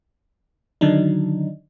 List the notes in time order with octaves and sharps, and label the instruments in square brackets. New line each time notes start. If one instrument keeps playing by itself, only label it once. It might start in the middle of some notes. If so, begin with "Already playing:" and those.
[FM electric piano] D3 D#3 F#3 D4 D#4